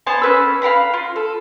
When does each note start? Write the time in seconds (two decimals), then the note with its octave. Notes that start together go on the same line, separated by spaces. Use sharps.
0.07 B3 C5 G#5 A5
0.22 C#4 B4 E6
0.62 F5 G5 A#5 B5
0.94 F4
1.16 A4